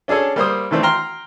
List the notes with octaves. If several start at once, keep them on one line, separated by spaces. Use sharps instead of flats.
C#4 D4 G#4 A4 C#5
G3 A#3 C5 D#6
D#3 E3 A3 C4 D4
G5 A#5 C6 F6